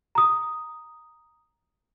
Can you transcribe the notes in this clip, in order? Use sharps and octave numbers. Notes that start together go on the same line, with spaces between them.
A#5 D#6